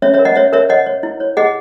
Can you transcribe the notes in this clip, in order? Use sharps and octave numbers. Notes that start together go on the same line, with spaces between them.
C#4 C#5 E5
C#5 E5
A#4
D#5 F#5
C#5 E5
A#4 C#5 E5
C#5 D#5 F#5
C#5
E4
C#5
G#4 D#5 F#5